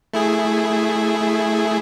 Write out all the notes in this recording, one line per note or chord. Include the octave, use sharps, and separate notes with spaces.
A3 E4 G#4